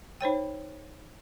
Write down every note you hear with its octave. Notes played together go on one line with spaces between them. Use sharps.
D#4 C5 C#5 G5